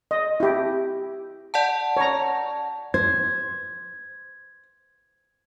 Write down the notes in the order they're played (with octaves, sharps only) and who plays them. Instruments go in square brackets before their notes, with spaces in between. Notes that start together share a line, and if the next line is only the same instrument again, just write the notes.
[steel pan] D#5
E4 G4
[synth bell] D5 F#5 A5
[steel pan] C#5 A#5
[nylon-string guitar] C5 [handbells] G#6